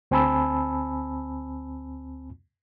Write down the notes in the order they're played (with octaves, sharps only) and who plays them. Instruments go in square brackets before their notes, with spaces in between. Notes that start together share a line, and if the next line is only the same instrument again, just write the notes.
[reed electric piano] D2 C4 G#5 A5 B5 E6